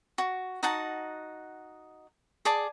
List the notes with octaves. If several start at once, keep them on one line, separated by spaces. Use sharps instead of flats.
F#4
D#4 F#4 F#5 A5
G#4 D5 A5